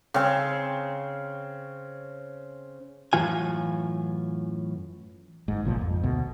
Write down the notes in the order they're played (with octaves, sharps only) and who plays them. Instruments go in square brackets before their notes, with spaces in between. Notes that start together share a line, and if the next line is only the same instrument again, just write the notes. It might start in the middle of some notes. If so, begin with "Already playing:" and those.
[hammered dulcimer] C#3 C4
[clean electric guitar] F#2 A2 E3 F4 G#5
[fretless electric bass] G1 G#2
G#1 C#2 A#2 F3
F2
D2 B2